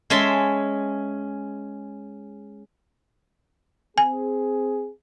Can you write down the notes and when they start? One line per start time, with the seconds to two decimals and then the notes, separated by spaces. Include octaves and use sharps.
0.10 G#3 C#4 E5 A5 C6
3.98 C4 G#4 G#5